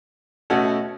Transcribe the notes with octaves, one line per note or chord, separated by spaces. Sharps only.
B2 A3 C#4 F#4 A4